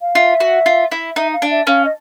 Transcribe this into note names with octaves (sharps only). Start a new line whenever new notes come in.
F5
F4 E5
F#4
F4
E4
D#4 E5
F5
D4
E5
C#4 F5
D#5